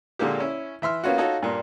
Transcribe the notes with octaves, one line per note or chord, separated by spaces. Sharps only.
A#2 D3 G#3 A#3 G4
C#4 E4
E3 E5 C6 F6
A#3 B3 C#4 F4 F#4
D#4 F4 F#4 A4 C#5
G2 A#2